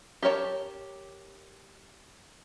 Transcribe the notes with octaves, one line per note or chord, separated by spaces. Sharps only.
G4 A#4 C#5 A5